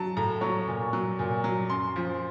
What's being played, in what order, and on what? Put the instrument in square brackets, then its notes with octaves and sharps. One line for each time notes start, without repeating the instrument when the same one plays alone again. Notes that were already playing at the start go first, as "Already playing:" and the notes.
Already playing: [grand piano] F#3 A5
A2 A#5
F#3 C#5
A#2
F#3
A#2
F#3
F#2 C6
F3